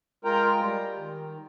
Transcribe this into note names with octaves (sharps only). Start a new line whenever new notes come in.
G#3 F4 A#4 G5 A#5
G3
D#3